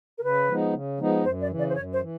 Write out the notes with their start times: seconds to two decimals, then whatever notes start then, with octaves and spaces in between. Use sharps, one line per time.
0.18 A#4
0.23 C#3 B4
0.48 F3 G#3 B3 D#4
0.74 C#3
0.99 F3 G#3 B3 D#4
1.24 F#2 C5
1.41 D5
1.50 C#3 E3
1.59 D5
1.69 C5
1.75 F#2 C#5
1.93 C5
2.01 E3